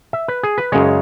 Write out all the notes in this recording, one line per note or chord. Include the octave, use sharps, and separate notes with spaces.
E5
B4
G#4
B4
F#2 C#3 G#3 C#5